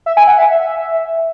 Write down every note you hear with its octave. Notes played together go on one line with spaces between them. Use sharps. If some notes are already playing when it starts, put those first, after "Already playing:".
E5
G#5
F#5
E5
E5